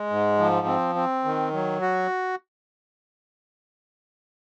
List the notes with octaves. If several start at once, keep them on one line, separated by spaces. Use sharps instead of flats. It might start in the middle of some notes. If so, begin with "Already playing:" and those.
Already playing: G#3
G#2
F3
C4
C4
D#3
F#3
F#4